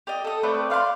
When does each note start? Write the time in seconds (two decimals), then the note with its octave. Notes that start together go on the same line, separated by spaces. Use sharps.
0.07 G4 D5 D#5
0.24 A4 D#6
0.43 A3 C4 B4 D5
0.70 D5 F5 F#5 C6